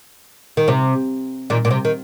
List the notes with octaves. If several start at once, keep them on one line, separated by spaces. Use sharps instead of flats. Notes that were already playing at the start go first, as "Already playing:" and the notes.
D#3
C3
A#2 D#3
A#2
C3
D#3